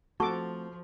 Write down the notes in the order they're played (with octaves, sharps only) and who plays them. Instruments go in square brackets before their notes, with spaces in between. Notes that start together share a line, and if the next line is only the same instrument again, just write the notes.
[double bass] F3 [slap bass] A3 C4 [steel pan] F#4 A4 D6 [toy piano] A5 C#6